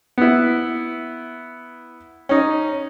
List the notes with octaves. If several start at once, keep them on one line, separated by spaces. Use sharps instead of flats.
B3 E4
C#4 D#4